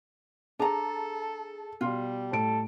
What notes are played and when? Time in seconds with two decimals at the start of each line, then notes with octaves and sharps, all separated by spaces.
0.59 D4 G#4 A4 A5 A#5
1.81 B2 G3 F4
2.32 A2 A4 D7